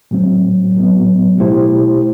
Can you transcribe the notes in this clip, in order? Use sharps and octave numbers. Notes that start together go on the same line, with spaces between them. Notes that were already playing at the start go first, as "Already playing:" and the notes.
A2 F#3 C4
A2 F#3 B3
B2 A3 E4 G4 C5